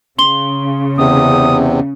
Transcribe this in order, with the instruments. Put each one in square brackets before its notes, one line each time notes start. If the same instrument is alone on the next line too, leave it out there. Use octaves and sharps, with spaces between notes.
[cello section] C#3 [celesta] C6 G7
[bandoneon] E2 C3 [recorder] D#6